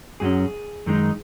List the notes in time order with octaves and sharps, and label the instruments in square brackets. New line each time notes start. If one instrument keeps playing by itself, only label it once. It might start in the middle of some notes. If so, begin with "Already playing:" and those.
[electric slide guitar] F#2 F#3 C#4 G#4
F#2 D#3 G#3 D#4